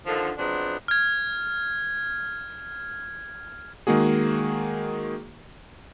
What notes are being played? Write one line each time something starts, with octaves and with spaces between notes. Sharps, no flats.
D3 D#3 F3
F3 F#3 G#3 B3 C4 D4
F6 G#6
D#3 G#3 A#3 F#4 G#4